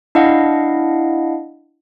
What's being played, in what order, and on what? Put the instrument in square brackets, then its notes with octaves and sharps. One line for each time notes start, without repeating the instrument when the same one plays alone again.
[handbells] D4 E4 D#5 F5 F#5